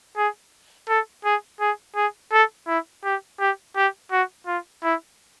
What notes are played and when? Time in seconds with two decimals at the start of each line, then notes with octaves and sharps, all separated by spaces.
0.17 G#4
0.88 A4
1.25 G#4
1.60 G#4
1.96 G#4
2.32 A4
2.68 E4
3.04 G4
3.40 G4
3.76 G4
4.11 F#4
4.47 F4
4.83 E4